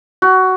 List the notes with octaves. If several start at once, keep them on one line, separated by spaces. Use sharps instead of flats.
F#4